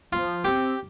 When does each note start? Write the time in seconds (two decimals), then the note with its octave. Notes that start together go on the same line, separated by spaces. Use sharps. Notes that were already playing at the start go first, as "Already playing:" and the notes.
0.13 F3 F4
0.44 C4 G4